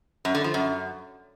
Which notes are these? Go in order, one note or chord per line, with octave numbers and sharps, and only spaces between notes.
F#2
D3
F3
F#2